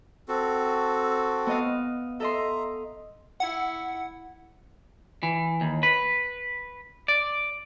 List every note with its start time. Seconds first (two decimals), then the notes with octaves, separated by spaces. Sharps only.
0.28 C4 F#4 A4
1.47 B3 D#5 F5
2.20 A4 D#5 E5 A#5 C6
3.40 E4 F#5
5.23 E3
5.61 D#2
5.83 B4
7.08 D5